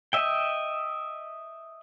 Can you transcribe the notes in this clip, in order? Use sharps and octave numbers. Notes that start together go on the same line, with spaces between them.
D#5 E5 G5